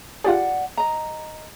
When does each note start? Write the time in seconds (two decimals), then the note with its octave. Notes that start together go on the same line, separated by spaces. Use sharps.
0.24 F4 G4 G#4 D5 F#5
0.77 D#5 A#5